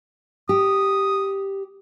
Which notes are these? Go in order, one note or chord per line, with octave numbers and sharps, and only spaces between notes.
G4 D#6